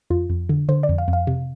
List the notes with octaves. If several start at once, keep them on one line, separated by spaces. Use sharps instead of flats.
F2 F4
F2
D3
D3 C5
D5
F2
F5
F2
F5
C3